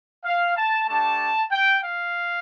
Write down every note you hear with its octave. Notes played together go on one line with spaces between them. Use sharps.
F5
A5
A3 D4 G4 A5
G5
F5